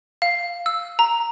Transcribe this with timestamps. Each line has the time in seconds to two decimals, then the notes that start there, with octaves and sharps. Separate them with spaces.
0.22 F5
0.66 E6
0.99 A#5